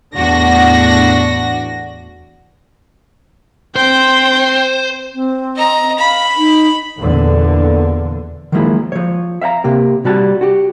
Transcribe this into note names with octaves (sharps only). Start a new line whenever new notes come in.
E2 A2 D4 F#4 A#6
C4 C5 G5
C4
D#5 A#5
F5 B5
D#4
E2 A#2 D3
D#3 F3 F#3 G#3 A#3 E4
F3 C#5
E5 F5 G5 A#5
C3 A#3 G4
C3 G3 F#4 A5
F#4 G4